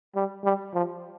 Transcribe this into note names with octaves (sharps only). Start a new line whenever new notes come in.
G3
G3
F3